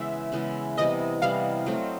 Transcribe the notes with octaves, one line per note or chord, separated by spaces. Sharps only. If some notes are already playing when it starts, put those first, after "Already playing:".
Already playing: C#3 E3 G#3 B3 B4 E5
C#3 E3 G#3 B3
C3 E3 G3 B3 D#5
C3 E3 G3 B3 F5
F#3 A3 C4